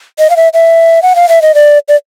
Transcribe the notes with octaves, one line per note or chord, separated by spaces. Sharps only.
D#5
F5
E5
E5
F#5
F5
E5
D#5
D5
D5